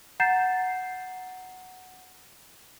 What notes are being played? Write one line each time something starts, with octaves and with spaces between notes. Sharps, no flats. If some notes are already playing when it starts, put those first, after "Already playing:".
F#5 A#5 G6 A6 C7 E7